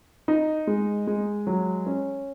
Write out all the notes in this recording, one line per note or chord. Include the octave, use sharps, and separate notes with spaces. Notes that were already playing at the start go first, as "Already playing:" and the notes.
D#4
G#3
G#3
F#3
C#4